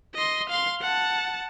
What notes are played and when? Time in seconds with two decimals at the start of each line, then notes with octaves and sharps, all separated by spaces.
0.15 D#5 C6
0.49 F5 C6
0.81 F#5 A5